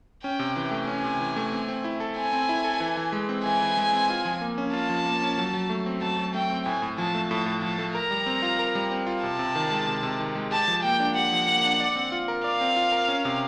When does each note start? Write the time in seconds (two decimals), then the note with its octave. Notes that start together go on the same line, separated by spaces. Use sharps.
0.23 C#4 G5
0.39 C3
0.56 E3
0.71 A3
0.87 C#4 G#5
1.04 C3
1.20 E3
1.36 A3
1.52 C4
1.68 C4
1.84 E4
2.00 A4
2.17 C4 G#5
2.33 C4
2.49 E4
2.64 A4
2.80 E3
2.97 E3
3.12 G#3
3.29 C4
3.45 E3 G#5
3.61 E3
3.77 G#3
3.93 C4
4.10 F4
4.25 F3
4.41 A#3
4.58 C#4
4.73 F4 A5
4.89 F3
5.06 A#3
5.22 C#4
5.38 F#3
5.54 F#3
5.70 A3
5.86 C4
6.02 F#3 A5
6.18 F#3
6.34 A3 G5
6.50 C4
6.66 A2 G#5
6.82 A2
6.98 F3 A5
7.15 A3
7.31 A2 A5
7.46 A2
7.62 F3 A5
7.79 A3
7.95 A#4 A#5
8.11 G3
8.26 C4
8.42 F4
8.59 A#4
8.75 G3
8.91 C4
9.07 F4
9.23 C3 A5
9.39 C3
9.55 D#3
9.71 G#3
9.87 C3
10.03 C3
10.20 D#3
10.35 G#3
10.51 G4 A5
10.68 F3
10.83 A#3 G5
10.99 D4
11.16 G4 F#5
11.32 F3
11.48 A#3
11.65 D4
11.80 D5
11.96 C4
12.12 F4
12.28 A#4
12.44 D5 F5
12.61 C4
12.76 F4
12.92 A#4
13.08 C#4
13.25 C3